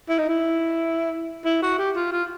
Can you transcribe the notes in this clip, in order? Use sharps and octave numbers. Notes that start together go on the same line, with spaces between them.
E4
D#4
E4
E4
F#4
G4
F4
F4